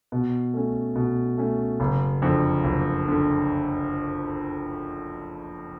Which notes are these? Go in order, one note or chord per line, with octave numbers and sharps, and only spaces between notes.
B2
A3 C#4
B2
A3 C#4
F#1
F2 D3
F#1
D3